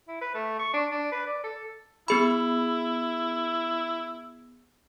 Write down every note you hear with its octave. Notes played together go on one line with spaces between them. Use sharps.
E4
B4
A3
C#6
D4
D4
B4
D5
A4
B3 E4 G#4 B5